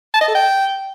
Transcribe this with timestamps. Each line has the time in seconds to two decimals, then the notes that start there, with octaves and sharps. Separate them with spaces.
0.14 A5
0.21 D#5
0.28 A4
0.35 G5